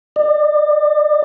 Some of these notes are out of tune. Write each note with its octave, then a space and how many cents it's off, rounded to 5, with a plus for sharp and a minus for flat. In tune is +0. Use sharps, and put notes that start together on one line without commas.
D5 +35